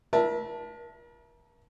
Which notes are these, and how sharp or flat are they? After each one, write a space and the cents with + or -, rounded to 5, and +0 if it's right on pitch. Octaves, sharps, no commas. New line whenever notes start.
A#4 +40 E5 +0 A5 +0